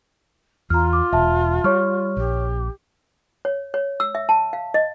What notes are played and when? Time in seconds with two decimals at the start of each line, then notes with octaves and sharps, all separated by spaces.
0.70 E2 F4 A#5 F6
0.93 D6
1.13 E1 E5 A5
1.64 G3 C#5 C#6 F6
2.17 A#1 G4
3.45 C#5
3.74 C#5
4.00 E6
4.15 E5
4.29 A5
4.53 F5
4.74 D#5